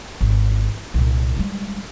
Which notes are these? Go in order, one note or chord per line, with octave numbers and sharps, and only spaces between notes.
G#1
C2 A#2
G3 G#3